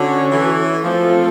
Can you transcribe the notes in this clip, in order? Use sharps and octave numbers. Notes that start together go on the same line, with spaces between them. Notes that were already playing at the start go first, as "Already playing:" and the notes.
Already playing: D3 C#4 F#4 A4 C#5
E3
F3 A3 C4 F4 A4